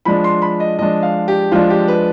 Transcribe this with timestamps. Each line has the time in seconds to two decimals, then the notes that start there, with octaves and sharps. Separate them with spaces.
0.05 F3 G#3 D4 B5
0.24 C6
0.42 B5
0.60 D#5
0.79 F3 G#3 D4 D#5
1.03 F5
1.28 G4
1.52 F3 G#3 D4 F4
1.70 G4
1.88 B4